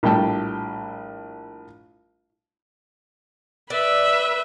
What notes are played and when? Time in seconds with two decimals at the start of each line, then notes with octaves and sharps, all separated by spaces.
0.03 A#1 A2 G3 G5 A5
3.70 B4 D5 E5